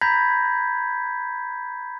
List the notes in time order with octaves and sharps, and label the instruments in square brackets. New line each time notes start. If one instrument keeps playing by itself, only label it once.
[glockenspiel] A#5 B5 G6 G#6 A#6 B6